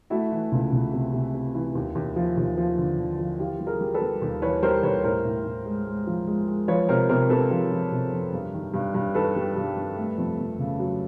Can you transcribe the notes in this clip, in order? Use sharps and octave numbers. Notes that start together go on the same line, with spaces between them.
A3 E4 F#4
E3
C#2
C#2
C3
C3
C3
E3
D#2
D#2
F3
D#2
F3
D3
D3
F3
E3 F4 G4
G3
G#4 A#4
G3
A4 B4
G3
D#2
E3 B4 C#5
G3 A#4 C5
D#2 B4 C#5
A2 A#4 C5
A2
A2
G#3
G#3
F3
G#3
G#3
F3 B4 C#5
C3 A#4 C5
C3 A#4 C5
C3 A4 B4
F3 G#4 A#4
F3
C3
F2
G2
D#3
G2
G2
D#3 A4 B4
G3
G2
G3
A3
F2
F2
C#3
F#3